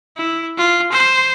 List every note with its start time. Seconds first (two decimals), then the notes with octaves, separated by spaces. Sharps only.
0.17 E4
0.58 F4
0.92 C5